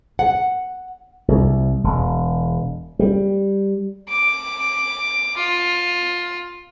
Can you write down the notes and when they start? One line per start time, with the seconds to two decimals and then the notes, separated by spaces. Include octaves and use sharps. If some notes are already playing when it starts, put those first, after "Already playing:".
0.19 F#5
1.28 C2
1.84 E1
2.99 G3
4.09 D6
5.37 F4